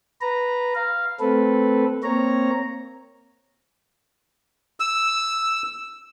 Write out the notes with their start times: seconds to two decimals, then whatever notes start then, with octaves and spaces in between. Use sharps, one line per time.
0.21 B4 A#5
0.75 F5
1.20 A3 C4 A4 B4
2.03 A#3 C4 C#5 A#5
4.80 E6